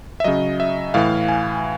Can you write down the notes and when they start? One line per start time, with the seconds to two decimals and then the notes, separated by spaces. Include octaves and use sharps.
0.20 E5
0.24 C#3 F#3 D#5
0.60 E5
0.94 A2 E3 F5
1.28 G#5